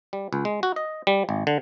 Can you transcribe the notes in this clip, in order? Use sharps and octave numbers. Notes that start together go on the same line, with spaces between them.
G3
C#2
G#3
F#4
D#5
G3
G#1
D3